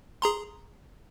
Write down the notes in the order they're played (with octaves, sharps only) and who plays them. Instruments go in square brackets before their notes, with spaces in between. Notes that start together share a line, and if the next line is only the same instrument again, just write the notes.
[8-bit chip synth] G#4 A#5 C6